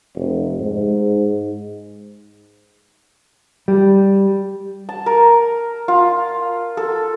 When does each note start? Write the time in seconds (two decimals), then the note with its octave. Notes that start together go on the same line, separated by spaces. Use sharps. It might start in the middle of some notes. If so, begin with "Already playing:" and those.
0.16 F1
0.60 G#2
3.68 G3
4.89 A5
5.06 A#4
5.88 F4
6.77 A4